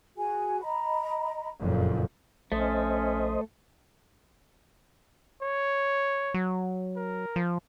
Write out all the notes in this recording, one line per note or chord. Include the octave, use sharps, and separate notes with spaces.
F#4 G#4 G#5
D#5 A#5 B5
F#1 F2 A#2
A#1 A3 C#4 C5 D#5
C#5
F#3
A#4
F3